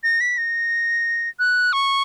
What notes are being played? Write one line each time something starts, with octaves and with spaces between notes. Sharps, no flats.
A#6
B6
A#6
F#6
C#6